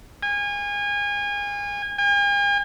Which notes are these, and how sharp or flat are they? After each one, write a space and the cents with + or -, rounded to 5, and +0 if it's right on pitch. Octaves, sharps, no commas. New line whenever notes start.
G#5 -30
G#5 -45